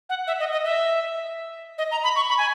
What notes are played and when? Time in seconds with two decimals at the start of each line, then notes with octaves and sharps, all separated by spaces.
0.09 F#5
0.27 E5
0.40 D#5
0.52 D#5
0.65 E5
1.78 D#5
1.91 A#5
2.04 B5
2.16 C#6
2.29 B5
2.38 G#5